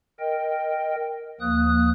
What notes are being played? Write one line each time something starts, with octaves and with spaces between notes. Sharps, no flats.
A#4 D#5 G5
D#2 F3 A#3 D#6 F#6